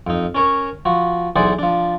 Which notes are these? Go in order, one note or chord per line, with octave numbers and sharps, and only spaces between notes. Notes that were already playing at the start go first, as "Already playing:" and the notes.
F2 D#4
C#4 A#4 C#5
F3 F#4
B1 E3 G#4 C5 D5 F#5
F3 D4